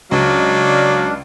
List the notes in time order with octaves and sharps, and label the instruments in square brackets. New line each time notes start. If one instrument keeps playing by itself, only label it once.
[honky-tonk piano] C#2 [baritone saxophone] F#3 [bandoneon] D4 [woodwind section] D5 D#5 F5